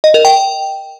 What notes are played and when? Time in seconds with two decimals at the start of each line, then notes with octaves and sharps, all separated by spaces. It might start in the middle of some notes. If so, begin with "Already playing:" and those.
0.04 D#5
0.14 A#4
0.25 G5